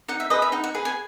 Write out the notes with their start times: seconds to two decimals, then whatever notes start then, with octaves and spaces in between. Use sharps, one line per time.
0.08 D#4 F#5
0.20 E5
0.30 G#4 B4 D#5
0.42 E5
0.52 D#4 F#5
0.64 F#5
0.74 G#4 B4
0.85 G#5